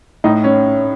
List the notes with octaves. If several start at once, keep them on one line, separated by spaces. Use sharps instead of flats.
A2 D#4
C#4